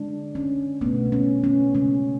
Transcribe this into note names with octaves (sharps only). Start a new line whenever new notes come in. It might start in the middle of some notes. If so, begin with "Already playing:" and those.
Already playing: D3 G#3 D4
C#4
B2 A3 B3
C#4
C#4
C#3 G#3 C#4